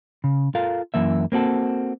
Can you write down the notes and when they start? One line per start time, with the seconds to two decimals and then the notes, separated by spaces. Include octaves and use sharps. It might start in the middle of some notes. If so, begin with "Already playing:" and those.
0.24 C#3
0.55 F4 A4 A#4 F5
0.94 F#2 E3 A#3 E5
1.32 A#3 C4 F#4 A4